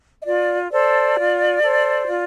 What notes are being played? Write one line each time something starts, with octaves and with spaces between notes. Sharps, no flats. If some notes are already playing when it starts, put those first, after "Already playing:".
D#5
F4 D5
A4 C5 D5
F4
A4 C5
F4